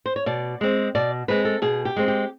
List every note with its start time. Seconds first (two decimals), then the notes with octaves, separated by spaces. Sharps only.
0.06 C5
0.16 C#5
0.26 B2 D5
0.61 G#3 C4
0.95 B2 D5
1.28 G#3 C4 B4
1.45 A4
1.62 B2 G#4
1.85 G4
1.96 G#3 C4
2.08 G4